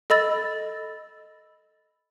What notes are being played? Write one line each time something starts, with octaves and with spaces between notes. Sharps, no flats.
A4 D#5 B5 E6 A6